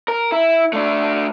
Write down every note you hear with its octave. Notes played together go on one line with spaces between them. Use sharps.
A#4
E4
A3 D4